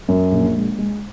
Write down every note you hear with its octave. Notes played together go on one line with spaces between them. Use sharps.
F#2
A#1
G#3
G#3